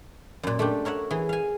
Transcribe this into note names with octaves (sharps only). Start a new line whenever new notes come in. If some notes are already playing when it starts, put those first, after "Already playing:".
F#2 A#2
A3 D4 G4
A#4 C#5 E5 F#5
E3 G#4
F5 G#5